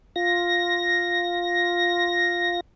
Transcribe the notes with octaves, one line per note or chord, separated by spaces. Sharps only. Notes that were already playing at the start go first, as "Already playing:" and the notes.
F4 A#6